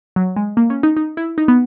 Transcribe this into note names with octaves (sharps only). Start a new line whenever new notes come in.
F#3
G#3
A#3
C#4
D#4
D#4
E4
D#4
B3